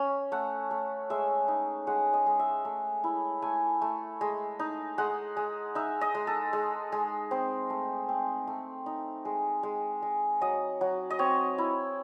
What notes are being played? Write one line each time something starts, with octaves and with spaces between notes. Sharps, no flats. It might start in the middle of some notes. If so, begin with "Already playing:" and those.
Already playing: C#4
A3 F#5
A3
G#3 E5
D#4
G#3 F#5
D#5
G#3
E5
A3
E4
A3 G#5
A3
G#3
D#4
G#3 F#5
G#3
D#4 E5
D#5
G#3
A4
G#3
G#3
C4 C5
A3
C4
A3
D#4
G#3
G#3
G#3
F#3 D#5
F#3
D#5
C4 C#5
E4